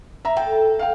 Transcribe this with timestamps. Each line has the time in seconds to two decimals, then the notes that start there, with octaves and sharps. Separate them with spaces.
0.25 E5 A#5
0.37 A4 G5
0.79 F5 G5